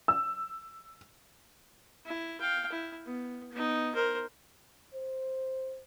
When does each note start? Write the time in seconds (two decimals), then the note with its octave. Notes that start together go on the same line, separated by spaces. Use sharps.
0.08 E6
2.06 E4
2.40 F5 G5
2.72 E4
3.06 B3
3.52 B3 D#4
3.95 A#4 C5
4.94 C5